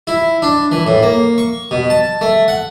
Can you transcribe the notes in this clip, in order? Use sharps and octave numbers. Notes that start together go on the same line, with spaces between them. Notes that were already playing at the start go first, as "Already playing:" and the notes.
E4
D4
E3
A2
A#3
C#6
B2
A5
A3
F#5